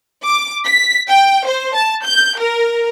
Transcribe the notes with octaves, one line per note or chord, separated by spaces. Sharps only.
D6
B6
G5
C5
A5
G6
A#4